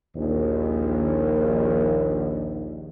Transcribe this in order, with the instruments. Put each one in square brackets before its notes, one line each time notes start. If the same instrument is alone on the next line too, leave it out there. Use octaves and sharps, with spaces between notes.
[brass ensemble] A#1 D#2